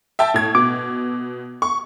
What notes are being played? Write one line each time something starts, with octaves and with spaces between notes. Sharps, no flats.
E5 G5 A5
A2 G#6
B2 D6
C#6